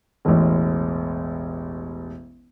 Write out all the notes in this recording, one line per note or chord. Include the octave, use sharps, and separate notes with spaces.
E1 A1